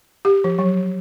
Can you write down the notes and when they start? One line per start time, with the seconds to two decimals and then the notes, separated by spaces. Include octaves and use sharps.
0.25 G4
0.44 F3
0.59 F#3